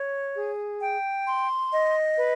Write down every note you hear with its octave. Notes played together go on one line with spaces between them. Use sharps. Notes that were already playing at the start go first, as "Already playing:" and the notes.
Already playing: C#5
G#4
G5
C6
D#5
B4